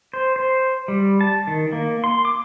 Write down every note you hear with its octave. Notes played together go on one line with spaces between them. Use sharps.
C5
C5
G3
A5
D#3
A#3
C6
D6